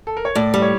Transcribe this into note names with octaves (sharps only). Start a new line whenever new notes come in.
A4
A#4
C#5
A2 D5
G3
C#5